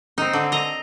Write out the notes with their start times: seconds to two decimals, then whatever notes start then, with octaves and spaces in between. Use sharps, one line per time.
0.18 C4 D#4
0.33 D3
0.52 D#5 A#5